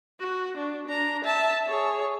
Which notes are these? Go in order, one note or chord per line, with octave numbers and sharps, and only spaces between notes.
F#4
D4
D4 A#5
E5 A5
G#4 C#5